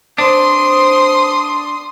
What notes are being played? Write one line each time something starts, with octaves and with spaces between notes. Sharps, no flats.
C4 D4 B4 C5 C6 D#6